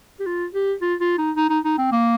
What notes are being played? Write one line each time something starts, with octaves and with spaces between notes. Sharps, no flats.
G4
F4
G4
F4
F4
D#4
D#4
D#4
D#4
C4
A#3